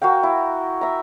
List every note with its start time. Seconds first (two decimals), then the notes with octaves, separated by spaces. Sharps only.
0.02 F#4 A#4 F5 G5
0.23 E4
0.81 E5 A#5